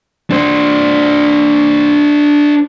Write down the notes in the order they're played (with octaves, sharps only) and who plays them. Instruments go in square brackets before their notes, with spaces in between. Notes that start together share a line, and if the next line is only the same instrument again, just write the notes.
[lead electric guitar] D4 C5